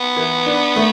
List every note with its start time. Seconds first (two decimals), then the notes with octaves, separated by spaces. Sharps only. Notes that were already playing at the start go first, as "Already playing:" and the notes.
Already playing: B3
0.17 E3
0.46 D4
0.76 A3